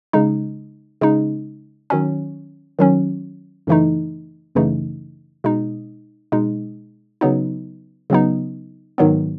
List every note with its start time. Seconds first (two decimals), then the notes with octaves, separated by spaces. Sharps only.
0.13 C#3 G#3 D#4
1.01 C#3 G#3 D#4
1.90 D#3 F#3 C#4
2.79 D#3 F#3 C#4
3.67 F#2 C#3 E3 A3 D#4
4.55 F#2 C#3 E3 A3 D#4
5.44 B2 G#3 D#4
6.32 B2 G#3 D#4
7.21 C#3 F#3 B3 D#4
8.10 C#3 F#3 B3 D#4
8.98 G#2 D#3 F#3 B3